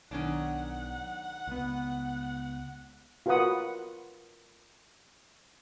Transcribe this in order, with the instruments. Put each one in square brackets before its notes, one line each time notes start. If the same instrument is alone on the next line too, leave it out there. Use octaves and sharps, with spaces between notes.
[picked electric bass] B1 [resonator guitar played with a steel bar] D#3 C#4 D4 [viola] F#5
[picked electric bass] C#2 B3
[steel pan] F4 F#4 A#4 B4 F#5 D#6